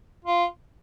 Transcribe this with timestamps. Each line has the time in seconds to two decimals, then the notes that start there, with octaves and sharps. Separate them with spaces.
0.25 F4